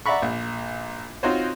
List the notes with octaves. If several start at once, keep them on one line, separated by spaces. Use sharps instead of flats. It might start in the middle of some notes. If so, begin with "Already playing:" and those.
D5 E5 F#5 A#5 B5 C#6
A#1
C4 D#4 F4 F#4 C5 C#5